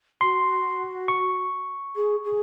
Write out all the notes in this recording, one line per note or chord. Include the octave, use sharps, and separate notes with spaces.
F#4 C6
C#6
G#4
G#4